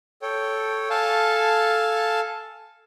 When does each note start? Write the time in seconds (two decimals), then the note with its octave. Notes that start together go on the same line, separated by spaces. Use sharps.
0.22 A4 C#5 G5
0.90 A4 F5 G#5 A5